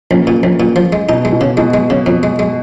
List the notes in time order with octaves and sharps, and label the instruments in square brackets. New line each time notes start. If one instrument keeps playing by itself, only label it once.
[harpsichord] A#1 [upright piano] C#3
[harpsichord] A#2
A#1
A#2
F3
G#3
[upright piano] B2 [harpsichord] D#4
[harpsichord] G#3
[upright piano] B2
[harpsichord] C#3
[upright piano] B2 [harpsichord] G#3
[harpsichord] G#3
C#3
F2
G#3
G#3